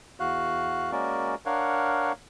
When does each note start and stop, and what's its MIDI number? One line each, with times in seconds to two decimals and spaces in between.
0.20 0.92 40
0.20 0.92 66
0.20 0.92 77
0.20 0.92 90
0.92 1.35 56
0.92 1.35 58
0.92 1.35 61
0.92 1.35 66
0.92 1.35 70
0.92 1.35 74
1.46 2.12 62
1.46 2.12 70
1.46 2.12 73
1.46 2.12 77
1.46 2.12 78